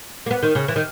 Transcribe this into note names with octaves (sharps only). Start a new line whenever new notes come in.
A#3
B3
D#3
C#3
E3
D#3